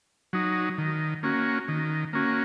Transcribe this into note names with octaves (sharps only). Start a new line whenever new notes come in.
F#3 D#4
D#3
A#3 C#4 F#4
D#3
A#3 C#4 F#4